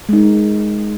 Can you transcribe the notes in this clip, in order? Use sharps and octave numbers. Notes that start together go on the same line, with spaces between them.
G#3 D#4